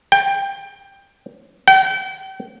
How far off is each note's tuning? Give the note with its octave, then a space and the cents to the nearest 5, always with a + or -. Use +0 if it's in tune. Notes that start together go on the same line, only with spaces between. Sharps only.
G5 +15
G5 -40